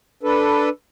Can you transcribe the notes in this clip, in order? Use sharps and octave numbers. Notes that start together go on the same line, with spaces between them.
D4 A4 B4